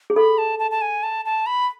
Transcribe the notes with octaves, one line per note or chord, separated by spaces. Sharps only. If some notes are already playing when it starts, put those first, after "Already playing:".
G#4
A4 B5
A5
A5
A5
G#5
A5
A5
B5